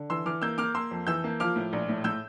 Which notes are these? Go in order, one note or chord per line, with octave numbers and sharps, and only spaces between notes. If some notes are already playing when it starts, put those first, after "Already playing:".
Already playing: D3
E3 C6 E6
E3 D6 F6
A#3 E6 G6
A#3 D6 F6
A#3 C6 E6
F2
E3 E6 G6
A#3
F3 D6 F6
A2
A#1
A2
A2 E6 G6